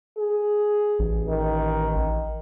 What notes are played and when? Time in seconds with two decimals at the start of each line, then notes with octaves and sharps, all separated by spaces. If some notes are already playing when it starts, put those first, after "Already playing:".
0.18 G#4
0.99 A1
1.28 D#3